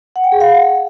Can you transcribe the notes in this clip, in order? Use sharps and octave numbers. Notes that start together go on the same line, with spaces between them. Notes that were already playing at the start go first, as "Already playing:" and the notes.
F#5
G5
G#4
F5
F#5